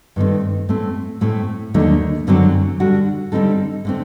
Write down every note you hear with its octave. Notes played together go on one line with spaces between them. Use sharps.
G2 D#3 A3 C4
A2 A3 C4
A2 A3 C4
D#2 D3 F#3 A3 D#4
F#2 D3 F#3 C4
D3 G3 D4 F#4
D3 G3 C4 D#4 A4
D3 A3 C4